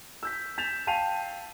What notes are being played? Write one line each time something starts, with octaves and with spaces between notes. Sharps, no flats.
E6 G6 B6
G6 A6 B6 E7 F7
F5 G5 A5 C7 D#7 F7